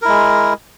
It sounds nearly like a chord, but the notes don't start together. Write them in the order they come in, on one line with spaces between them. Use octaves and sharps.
A#4 E4 G#3